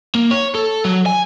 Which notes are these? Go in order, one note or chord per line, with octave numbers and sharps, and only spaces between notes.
A#3
C#5
A4
F#3
G#5